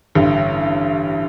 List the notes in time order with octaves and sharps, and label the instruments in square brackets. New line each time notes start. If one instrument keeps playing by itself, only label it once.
[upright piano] A1 G2 D3